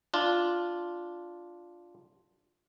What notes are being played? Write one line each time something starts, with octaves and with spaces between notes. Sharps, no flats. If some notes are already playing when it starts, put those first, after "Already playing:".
D4 F4